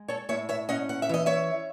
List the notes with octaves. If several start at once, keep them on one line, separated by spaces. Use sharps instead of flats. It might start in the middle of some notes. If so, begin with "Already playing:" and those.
Already playing: G#3
A4 C#5
A2 C#5 E5
C#5 E5
C#4 D#5 F#5
F#5
E5
E3 D#5
C#5 E5